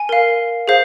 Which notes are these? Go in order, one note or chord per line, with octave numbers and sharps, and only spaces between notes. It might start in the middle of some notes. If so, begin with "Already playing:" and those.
Already playing: G#5
A#4 F5
G#4 C5 F5